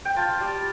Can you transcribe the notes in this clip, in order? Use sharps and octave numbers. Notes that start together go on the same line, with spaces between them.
G5
F4 A5
G3